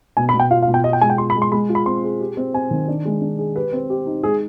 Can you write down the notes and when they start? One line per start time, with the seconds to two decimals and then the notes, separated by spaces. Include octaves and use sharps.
0.17 B2 G#5
0.29 B5
0.34 B2
0.40 G5
0.51 F4 F5
0.62 F5
0.68 B2
0.74 G5
0.84 F4 D#5
0.93 G5
1.01 G#3 G#5
1.10 G5
1.18 F4 C6
1.30 B5
1.35 G#3
1.42 C6
1.52 G#3 B5
1.69 F4
1.75 B5
1.86 C4 C6
2.04 G#4
2.20 G4
2.37 C4
2.54 C4 G#5
2.71 D#3
2.88 D4
3.05 G#3
3.21 D4
3.39 G#4
3.55 G4 B4
3.72 C4
3.90 G4
4.06 D#4
4.23 G#3 G#4